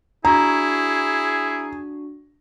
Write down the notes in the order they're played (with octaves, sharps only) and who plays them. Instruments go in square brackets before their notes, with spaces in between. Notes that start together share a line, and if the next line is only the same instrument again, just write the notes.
[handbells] D4 F#4 [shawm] E4 [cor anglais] G#4 [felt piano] A#5